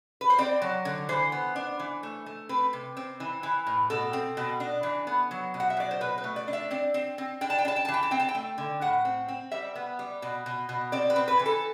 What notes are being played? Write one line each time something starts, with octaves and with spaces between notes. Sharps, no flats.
B4
C5
C4 D5
F#3
D3
E3 C5
B3
D4
E3
A3
A3
C4 B4
C3
C4
E3
E3
A2
B2 A4
C4
B2
D4
E3
B3
F#3
B2
F#5
E5
F#3 D5
C5
B2 B4
B4
A3
D5
D4
E5
C4 D5
C4
C4
D4 G5
A5
G5
D4
A5
G5
A5
E3
G5
A5
C4 G5
A5
G5
A3
D3
A2 F#5
C4
C4
G3 E5
B3
G3
B2
B2
B2
C4 D5
B4
C4
B4
E3
A4